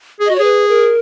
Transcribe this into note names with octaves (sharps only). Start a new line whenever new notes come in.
G#4
F#4 D#5
C#5
G#4 B4
A#4